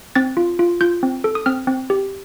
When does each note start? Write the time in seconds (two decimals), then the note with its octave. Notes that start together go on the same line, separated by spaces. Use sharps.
0.15 C4 A6
0.37 F4
0.59 F4
0.81 F4 G6
1.03 C4
1.24 A4
1.35 D#6
1.46 C4 F6
1.67 C4
1.90 G4